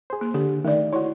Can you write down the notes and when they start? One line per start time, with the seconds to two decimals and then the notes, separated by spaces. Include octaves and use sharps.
0.10 G#4 C5
0.21 A#3
0.34 D3 G4
0.65 D#3 A3 D5
0.93 E4 F#4 C#5